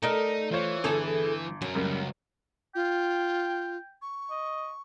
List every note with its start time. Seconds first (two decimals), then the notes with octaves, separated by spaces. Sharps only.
0.03 A3 D#4 A#4 D5 D#5 A#5
0.51 E3 F4 C5 C#5
0.84 G1 G#4 A4
1.62 F#2 F#3 A#4
1.75 C#2 F#2 G3 A#3
2.75 F4 G5
4.02 C#6
4.31 D#5